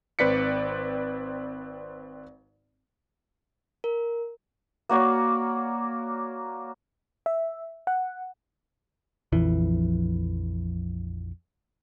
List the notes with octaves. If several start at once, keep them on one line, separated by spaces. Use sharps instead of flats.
G#1 C4 B4 D5 B6 C#7
A#4
A#3 F#4 C#5 D5
E5
F#5
A#1 F2 E3